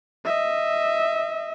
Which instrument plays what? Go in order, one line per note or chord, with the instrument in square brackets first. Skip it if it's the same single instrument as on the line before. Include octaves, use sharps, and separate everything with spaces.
[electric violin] D#5 E5